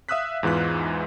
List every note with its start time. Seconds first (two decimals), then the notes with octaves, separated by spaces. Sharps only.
0.09 E5 F5 D#6 E6 F#6 B6
0.43 E2 G#2 E3 F4 F#6